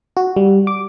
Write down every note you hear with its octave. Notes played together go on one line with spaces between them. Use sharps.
F#4
G3
D6